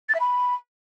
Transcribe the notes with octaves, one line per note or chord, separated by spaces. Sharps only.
A6
E5
B5